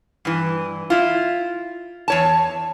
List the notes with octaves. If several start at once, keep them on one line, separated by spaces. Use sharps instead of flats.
G2 E3
E4 F4
E2 C#5 A5